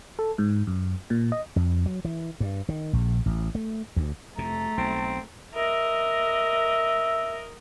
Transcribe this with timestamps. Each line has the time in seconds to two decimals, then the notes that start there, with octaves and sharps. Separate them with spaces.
0.19 A4
0.38 G#2
0.67 F#2
1.10 A#2
1.32 D#5
1.56 F2
1.86 F#3
2.05 E3
2.40 G2
2.69 D#3
2.93 A#1
3.26 A1
3.55 A3
3.96 D2
4.38 F2 C3 A3 A#5
4.77 B1 C4
5.55 A#4 D#5 E5